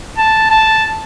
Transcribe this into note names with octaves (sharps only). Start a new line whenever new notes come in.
A5
A5